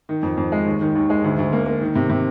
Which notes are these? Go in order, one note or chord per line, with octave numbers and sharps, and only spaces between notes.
D#3
F2
F2
G#3
D#2
D#3
D#2
G#3
D2
D2
A#3
A#3
D#3
C3
C3